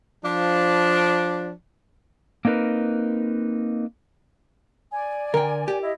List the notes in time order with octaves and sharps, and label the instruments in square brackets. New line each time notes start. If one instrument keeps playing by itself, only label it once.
[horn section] F3 D4
[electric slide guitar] A#3 C4 D#4 A#4 B4
[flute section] D5 G#5
[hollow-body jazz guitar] D3 G5 [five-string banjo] A#4
[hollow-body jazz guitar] G4
[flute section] E4 D#5